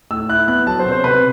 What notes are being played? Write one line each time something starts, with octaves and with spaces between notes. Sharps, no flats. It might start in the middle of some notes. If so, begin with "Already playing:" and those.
A2 E6
E4 F#6
B3 F#6
F#3 A5
C5
C3
C5
C3 B4